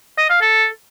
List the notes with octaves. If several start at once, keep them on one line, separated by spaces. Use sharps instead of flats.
D#5
F5
A4